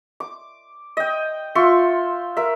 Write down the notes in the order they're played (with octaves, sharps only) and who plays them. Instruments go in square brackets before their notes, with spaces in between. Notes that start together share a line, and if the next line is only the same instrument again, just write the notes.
[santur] D6
D#5 G5
F4 E5 C6 C#6
A#4 E5